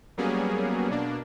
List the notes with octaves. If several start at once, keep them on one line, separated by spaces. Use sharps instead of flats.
F#3 G3 A#3 B3 C#4 G#4
B2 A#3 D4